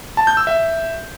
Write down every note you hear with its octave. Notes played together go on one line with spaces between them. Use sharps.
A5
G6
E6
E5